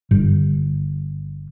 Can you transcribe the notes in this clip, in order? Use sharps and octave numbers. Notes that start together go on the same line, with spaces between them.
G1